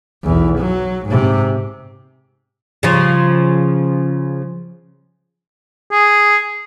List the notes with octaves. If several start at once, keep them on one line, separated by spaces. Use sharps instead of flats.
B1 E2
F#3
G#2 C3
C#3 F3
G#4